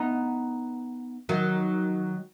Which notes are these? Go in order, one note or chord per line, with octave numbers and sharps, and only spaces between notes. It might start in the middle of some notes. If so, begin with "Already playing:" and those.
Already playing: B3 D#4
D#3 F#3